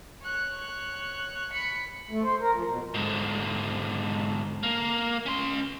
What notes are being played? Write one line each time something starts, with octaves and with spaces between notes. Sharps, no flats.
C#5 F#6
B5 C#7
A3
C5
A#4
F3
B2
G#2 D3
A#3
C#4 C6